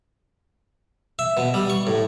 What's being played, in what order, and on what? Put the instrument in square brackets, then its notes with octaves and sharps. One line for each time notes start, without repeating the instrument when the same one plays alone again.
[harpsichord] E5
B2
G3
C#6
A2